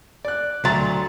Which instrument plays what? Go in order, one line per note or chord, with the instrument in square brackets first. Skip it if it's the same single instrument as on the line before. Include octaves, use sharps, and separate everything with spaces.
[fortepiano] D5 F#6
[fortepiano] D2 [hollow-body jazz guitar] F#3 [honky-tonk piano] E5 A#5 C6 [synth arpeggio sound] A6